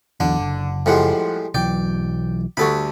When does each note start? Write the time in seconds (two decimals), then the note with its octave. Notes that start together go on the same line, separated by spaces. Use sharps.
0.20 B1 E2 B2 D3 D4
0.39 F#1
0.86 A2 F3 G3 G#3 F#5 C6
1.54 B1 E3 F#3 D5 G5
2.57 D2 D3 G3 A4 B5 C#6